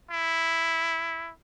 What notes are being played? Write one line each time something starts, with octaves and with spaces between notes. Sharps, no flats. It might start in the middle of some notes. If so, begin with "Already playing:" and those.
E4